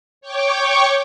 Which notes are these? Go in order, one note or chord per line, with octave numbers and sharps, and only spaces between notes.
C#5 G5 C#6 D6